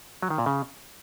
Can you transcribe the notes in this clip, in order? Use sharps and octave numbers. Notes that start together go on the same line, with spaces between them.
F#3
D#3
A#2
C#3